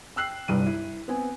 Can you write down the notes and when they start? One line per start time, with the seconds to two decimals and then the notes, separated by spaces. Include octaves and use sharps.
0.16 G5 E6 F#6 C7
0.48 G1 C2 G2 D#7
0.66 E4
1.08 B3 C4 G#5